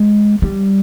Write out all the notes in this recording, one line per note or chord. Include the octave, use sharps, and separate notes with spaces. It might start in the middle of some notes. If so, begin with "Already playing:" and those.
Already playing: G#3
G3